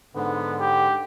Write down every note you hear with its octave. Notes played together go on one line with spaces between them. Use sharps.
G#2 D3 B3
G4